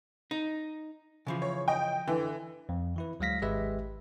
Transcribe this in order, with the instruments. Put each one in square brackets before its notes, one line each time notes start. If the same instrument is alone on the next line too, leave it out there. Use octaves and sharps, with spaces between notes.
[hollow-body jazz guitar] D#4
C#3 E3 F3
[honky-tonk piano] C#5
D#5 G5
[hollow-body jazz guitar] D3 [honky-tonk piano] E3
[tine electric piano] F2
E3 E4 B4
D2 F#3 G#3 F5 A#6 B6
G#1 G#3 G4 B4 E5